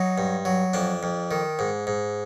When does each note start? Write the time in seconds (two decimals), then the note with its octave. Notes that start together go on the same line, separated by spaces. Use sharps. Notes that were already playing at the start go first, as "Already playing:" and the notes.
Already playing: F#3 D#4
0.18 G2
0.45 F#3
0.73 F2 D4
1.03 F2
1.31 D#3
1.59 G#2
1.87 G#2